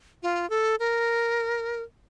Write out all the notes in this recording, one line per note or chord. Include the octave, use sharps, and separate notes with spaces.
F4
A4
A#4